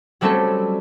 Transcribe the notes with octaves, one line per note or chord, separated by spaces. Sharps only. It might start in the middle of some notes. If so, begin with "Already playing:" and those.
F#3 G3 A3 C4 C#4 A4